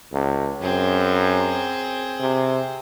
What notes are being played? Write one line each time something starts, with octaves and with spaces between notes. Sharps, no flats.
C#2
F#2 C4 G#4
C3